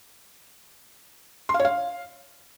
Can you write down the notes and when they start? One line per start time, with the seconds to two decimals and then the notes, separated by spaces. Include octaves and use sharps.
1.49 C6
1.54 F5
1.60 C#5
1.65 F5